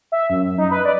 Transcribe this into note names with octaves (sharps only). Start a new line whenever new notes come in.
E5
F#2
D#4
B4
D5